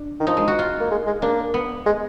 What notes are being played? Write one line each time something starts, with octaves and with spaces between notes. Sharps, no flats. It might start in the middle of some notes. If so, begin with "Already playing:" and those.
Already playing: D4
D#3
F3 D#4
G#3
F#4
F4
A#3
G#3
G#3
A#3 D4
B3
G#3